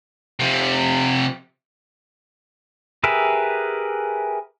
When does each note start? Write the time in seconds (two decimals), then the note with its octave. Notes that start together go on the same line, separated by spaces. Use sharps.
0.40 C3 F3
3.04 G4 G#4 A#4 B4 E5